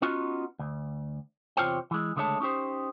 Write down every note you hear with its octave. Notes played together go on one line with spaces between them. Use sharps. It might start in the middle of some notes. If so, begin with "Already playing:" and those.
B3 C#4 D#4 F4 F#4
D2
E2 C3 F4 C5 C#5 G5
E3 G#3
C#2 D3 G#3 A3 C#5 A5
C#4 D#4 G4 C5